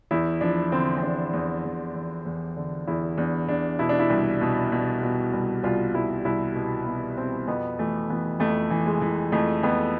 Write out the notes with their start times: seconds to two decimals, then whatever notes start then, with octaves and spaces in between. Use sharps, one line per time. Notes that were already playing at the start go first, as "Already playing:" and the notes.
0.11 E2 E4
0.41 F3 D4
0.72 D3 C4
0.97 C4
1.03 E2 D4
1.33 E2
1.64 E2
1.96 E2
2.26 E2
2.57 D3
2.87 E2 E4
3.18 E2 D4
3.48 E2 D4
3.79 B2 E4
3.89 D4
3.99 E4
4.10 C2
4.41 B2
4.72 B2
5.03 B2
5.33 C2
5.64 C2 F4
5.94 C2 E4
6.25 C2 E4
6.55 B2
6.86 B2 B3
7.17 B2 C4
7.48 F2 B3
7.79 E3 A3
8.10 E3 B3
8.40 F2 A3
8.70 E3
8.86 G#3
9.01 E3
9.32 F2 A3
9.63 F2 B3